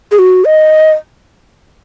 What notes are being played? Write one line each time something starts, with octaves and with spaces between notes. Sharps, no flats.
G#4
F#4
D#5